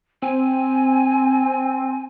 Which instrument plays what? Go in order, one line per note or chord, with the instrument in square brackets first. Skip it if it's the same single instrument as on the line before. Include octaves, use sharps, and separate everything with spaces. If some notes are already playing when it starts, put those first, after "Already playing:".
[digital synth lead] C4 [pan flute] G#5